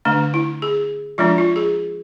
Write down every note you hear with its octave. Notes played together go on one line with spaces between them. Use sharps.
D3 A3 D4
E4
G#4
F3 G#3 D4 F4
F4
G#4